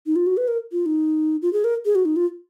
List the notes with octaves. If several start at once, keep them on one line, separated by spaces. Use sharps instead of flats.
D#4
F4
F#4
B4
A#4
F4
D#4
F4
G#4
A#4
G#4
F#4
D#4
F4